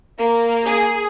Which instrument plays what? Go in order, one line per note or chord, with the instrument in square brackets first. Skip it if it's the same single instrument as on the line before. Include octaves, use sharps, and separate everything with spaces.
[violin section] A#3
[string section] G#4